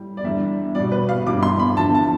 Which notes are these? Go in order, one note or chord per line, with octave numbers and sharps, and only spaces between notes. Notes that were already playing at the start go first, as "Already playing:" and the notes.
Already playing: A2 G3
D5
E2 D3 G3 E5
B2 G3 D5
B4
F5
G2 E3 G3 D6
C6
B5
E2 D3 F3 A5
A5